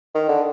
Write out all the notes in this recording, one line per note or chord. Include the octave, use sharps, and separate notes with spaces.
D#3
D3